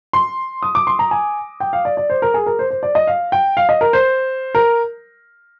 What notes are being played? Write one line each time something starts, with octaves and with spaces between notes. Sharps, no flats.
C6
D#6
D6
C6
A#5
G#5
G5
F5
D5
D5
C5
A#4
G#4
A#4
C5
C5
D5
D#5
F5
G5
F5
D#5
A#4
C5
A#4